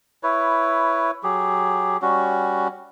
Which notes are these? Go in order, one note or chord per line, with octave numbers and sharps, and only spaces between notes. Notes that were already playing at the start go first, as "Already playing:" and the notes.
E4 B4 C#5
F#3 G4 G#4
G3 C#4 F#4